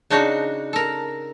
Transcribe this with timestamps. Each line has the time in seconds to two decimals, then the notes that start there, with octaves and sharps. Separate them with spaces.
0.10 C#3 D4 D#4 F#4
0.73 A4 A#4